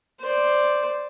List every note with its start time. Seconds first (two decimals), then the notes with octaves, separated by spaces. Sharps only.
0.20 C5 D5